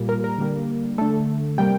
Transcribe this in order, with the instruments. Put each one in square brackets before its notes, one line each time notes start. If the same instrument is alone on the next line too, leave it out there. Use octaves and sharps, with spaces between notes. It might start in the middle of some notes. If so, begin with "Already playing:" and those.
Already playing: [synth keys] A#2 G3 A#3
A#4
A#4
D3 G3 A#3
D3 A3 A4
C3 G3 A#3 G5